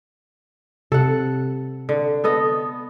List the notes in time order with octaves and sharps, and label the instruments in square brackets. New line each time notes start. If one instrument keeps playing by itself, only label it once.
[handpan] C3 [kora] A4 F#5
[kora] D3
B3 A4 D#5